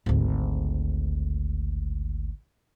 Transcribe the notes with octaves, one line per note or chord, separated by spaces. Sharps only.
G#1 D2